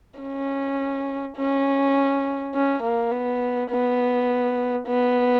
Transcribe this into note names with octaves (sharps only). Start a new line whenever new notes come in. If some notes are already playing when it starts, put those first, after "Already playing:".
C#4
C#4
C#4
A#3
B3
B3
B3